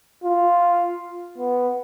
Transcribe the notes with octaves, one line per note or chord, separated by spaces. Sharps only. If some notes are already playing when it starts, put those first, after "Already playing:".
F4
B3